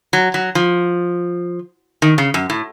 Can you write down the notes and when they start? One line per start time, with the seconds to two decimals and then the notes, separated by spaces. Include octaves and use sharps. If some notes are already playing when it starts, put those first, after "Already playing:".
0.13 F#3
0.34 F#3
0.55 F3
2.02 D#3
2.18 C#3
2.34 F#2
2.50 A2